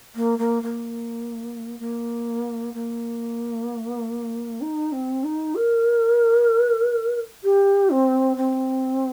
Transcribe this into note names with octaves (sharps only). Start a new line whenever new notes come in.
A#3
A#3
A#3
A#3
A#3
D#4
C4
D#4
A#4
G4
C4
C4